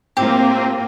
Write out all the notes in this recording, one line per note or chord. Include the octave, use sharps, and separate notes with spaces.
A2 A#3 C4 F4 G4